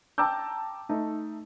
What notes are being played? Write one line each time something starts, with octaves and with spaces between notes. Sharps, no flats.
G5 A5 A#5 D6 E6 G6
A3 D#4